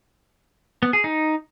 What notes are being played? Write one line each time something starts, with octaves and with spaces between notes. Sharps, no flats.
B3
G#4
D#4